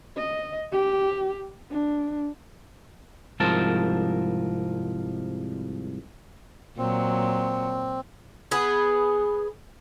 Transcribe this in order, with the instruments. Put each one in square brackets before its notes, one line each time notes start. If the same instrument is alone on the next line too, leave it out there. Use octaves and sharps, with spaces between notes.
[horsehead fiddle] D#5
G4
D4
[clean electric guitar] C2 G#2 F3 A#4 A5
[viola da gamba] A#2 F#3 [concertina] C4
[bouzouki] B3 G#4